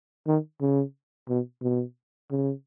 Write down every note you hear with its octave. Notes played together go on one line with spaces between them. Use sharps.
D#3
C#3
B2
B2
C#3